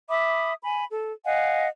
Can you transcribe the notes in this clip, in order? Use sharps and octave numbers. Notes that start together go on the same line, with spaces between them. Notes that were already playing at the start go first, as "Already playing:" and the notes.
E5 B5 D6 D#6
G#5 B5
A4
D#5 F5 F#5 G#5